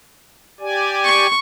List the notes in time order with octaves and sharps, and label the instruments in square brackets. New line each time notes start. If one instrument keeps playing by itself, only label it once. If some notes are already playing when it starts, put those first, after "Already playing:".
[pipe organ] G4 D5 G#5
[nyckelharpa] C#6